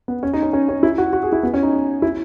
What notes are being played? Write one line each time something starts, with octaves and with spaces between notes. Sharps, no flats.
B3
C#4
D#4
C#4
C#4
C#4
E4
F#4
F#4
G#4
E4
B3
C#4
D#4
E4